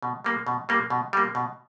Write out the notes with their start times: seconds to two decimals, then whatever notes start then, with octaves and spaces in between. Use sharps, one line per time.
0.02 B2
0.24 G3 A#3
0.47 B2
0.69 G3 A#3
0.90 B2
1.13 G3 A#3
1.35 B2